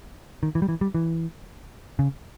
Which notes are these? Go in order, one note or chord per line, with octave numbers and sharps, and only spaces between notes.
D#3
E3
G3
E3
G3
E3
C#3